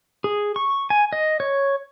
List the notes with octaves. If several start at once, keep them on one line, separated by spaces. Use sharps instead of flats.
G#4
C#6
G#5
D#5
C#5